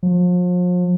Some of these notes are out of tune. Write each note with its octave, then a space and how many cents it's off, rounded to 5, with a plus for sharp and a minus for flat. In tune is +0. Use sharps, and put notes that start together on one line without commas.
F3 +40